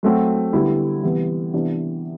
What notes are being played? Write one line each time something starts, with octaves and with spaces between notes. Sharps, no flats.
F#3 A3 C4 F#4
D3 G3 B3 E4
C3 E3 G3 B3
C3 E3 B3 D4